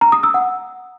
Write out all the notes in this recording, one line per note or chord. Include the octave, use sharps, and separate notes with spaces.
A#5
D#6
E6
F#5